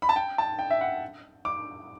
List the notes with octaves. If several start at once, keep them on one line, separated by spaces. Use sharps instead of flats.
B5
A5
G5
A5
G5
E5
F#5
D6